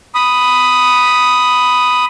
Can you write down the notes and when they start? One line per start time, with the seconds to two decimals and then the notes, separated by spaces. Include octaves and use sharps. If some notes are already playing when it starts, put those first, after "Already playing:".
0.15 B5 D#6